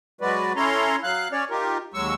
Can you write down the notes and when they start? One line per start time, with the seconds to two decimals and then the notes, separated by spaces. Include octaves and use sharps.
0.21 F#3 G#3 F#4 B4 D5
0.56 C#4 E4 A4 C#5 A#5 C6
1.03 F#3 F5 F#6
1.32 C#4 C#5 D5
1.50 D#4 F4 G4 A#4
1.94 D#2 F#3 G#3 C#6 E6